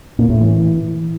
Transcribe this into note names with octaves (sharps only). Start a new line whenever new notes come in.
A#2
A2
E3